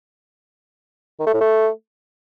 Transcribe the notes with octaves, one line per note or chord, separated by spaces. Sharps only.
D#3
A3
A2
A3